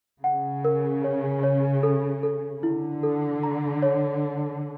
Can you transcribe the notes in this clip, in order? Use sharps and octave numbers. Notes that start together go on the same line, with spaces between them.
C#3 F#5
A#4
C#5
C#5
A4
A4
D3 E4
A4
A#5
C#5